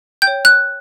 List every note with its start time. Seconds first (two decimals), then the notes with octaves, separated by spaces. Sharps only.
0.22 G5 G6
0.27 C#5
0.45 F#6